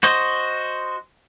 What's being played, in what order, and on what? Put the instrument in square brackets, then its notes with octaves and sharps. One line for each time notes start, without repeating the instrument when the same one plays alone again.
[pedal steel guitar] F#4 C5 D#5